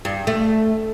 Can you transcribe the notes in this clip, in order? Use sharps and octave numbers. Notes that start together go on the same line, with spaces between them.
G2
A3